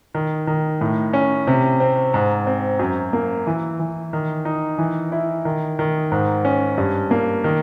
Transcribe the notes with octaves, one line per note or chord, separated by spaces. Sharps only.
D#3
D#3
A2
C#4
C3
C4
G#2
C4
F#2
A#3
E3
E3
D#3
D#4
E3
E4
D#3
D#3
G#2
C#4
G2
A#3
D#3